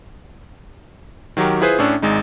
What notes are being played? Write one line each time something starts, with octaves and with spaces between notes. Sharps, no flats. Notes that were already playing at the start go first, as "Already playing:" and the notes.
D#3 F#3 F#4 G4 A#4
E4 F4 G#4 B4 C5
A2 C#4 D4 E6
G#1 G#3 D#4